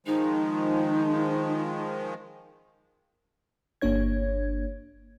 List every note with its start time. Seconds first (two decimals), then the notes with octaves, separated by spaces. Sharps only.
0.06 D#3 F3 G#3 D#4
3.81 G1 A#3 D4 C#5 G#6